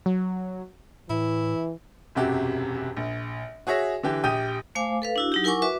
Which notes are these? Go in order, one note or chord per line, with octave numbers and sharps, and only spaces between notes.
F#3
A2 E3 E4
E1 F#2 C3 F#4 G4
A#1
F#4 G#4 C#5 E5 A#6
D3 E3 G4 G5
A#1 G4 G5 D#6 G6 D#7
A3 C5 F5 G#5 D6
A4 B4 F5
D4 E4 F#4
F#3 D#4 G4
E4 A#4 F#5 G#5 C#6 D6
F#4 B4 E5 D6